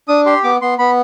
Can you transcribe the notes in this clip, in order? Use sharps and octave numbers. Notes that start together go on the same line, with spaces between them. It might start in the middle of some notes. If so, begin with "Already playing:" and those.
D4 D#6
G4 C6
B3 D6
B3 C6
B3 B5